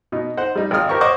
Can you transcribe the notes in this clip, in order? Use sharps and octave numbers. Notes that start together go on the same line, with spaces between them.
B2 D#4
D#4 C5 F#5
G3 D#4
G#1 G#3 F4 D#6 F6
G4 A#4 C5 C#6
C5 C#5 D#5 F#5 C#6 D6